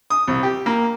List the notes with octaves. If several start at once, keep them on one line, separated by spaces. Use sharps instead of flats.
D#6
C2
G4
A#3